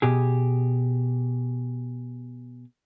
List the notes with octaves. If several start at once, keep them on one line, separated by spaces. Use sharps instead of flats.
B2 G4 G#4